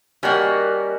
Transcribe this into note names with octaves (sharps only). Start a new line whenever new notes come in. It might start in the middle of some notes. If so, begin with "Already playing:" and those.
D#3 G3 A#3 C#4 F#4